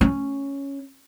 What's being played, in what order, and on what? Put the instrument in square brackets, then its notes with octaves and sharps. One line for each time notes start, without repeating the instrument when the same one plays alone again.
[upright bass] C#4